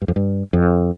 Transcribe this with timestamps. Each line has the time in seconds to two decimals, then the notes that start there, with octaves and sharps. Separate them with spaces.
0.02 G2
0.08 F2
0.16 G2
0.53 F2